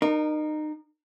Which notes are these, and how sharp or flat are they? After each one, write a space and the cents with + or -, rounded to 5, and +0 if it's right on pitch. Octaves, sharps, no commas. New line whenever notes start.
D#4 -30 A#4 +0